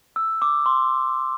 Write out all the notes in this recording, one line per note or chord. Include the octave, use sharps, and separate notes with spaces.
E6
D6
C6